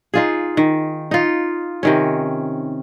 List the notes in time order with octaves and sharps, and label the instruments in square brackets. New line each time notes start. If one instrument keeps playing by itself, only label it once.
[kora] D#4 F4 G#4
D#3
D#4 F4
C3 D#3 C#4